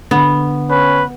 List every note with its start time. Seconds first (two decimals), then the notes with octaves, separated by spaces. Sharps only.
0.11 D3 B3
0.69 C#4 B4